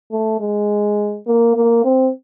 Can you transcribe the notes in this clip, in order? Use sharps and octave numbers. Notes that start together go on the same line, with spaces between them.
A3
G#3
A#3
A#3
C4